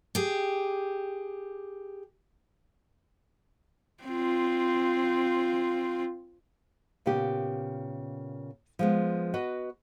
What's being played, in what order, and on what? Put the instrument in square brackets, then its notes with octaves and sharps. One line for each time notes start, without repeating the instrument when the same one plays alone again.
[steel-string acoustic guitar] G4 G#4
[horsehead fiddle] C4 F4
[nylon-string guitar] A#2 C#3 B3 G4
F3 G#3 B3
F#4 B4 D#5